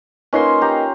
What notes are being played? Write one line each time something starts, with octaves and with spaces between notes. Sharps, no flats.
A#3 C#4 D#4 F4 B4 C6
G4 A#5